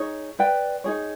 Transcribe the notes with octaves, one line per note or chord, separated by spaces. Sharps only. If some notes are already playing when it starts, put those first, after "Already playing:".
Already playing: D#4 G#4 C#5
B4 D5 G5
D#4 G#4 C#5